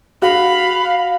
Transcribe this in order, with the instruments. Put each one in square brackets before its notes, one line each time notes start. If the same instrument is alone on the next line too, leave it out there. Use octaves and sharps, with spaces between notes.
[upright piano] F#4 [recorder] F5 [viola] B5